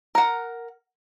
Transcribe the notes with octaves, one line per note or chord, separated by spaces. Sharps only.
A#4 F#5